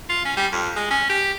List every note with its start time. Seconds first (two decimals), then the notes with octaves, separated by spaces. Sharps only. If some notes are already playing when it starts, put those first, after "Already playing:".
0.09 F4
0.25 C#4
0.37 G3
0.52 F2
0.76 G#3
0.90 C#4
1.09 G4